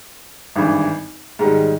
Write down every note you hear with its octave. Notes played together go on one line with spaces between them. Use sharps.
G#1 G2 E3
G#2 D#3 G3